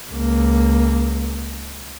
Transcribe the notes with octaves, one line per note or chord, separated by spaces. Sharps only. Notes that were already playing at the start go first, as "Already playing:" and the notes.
C#2 A#3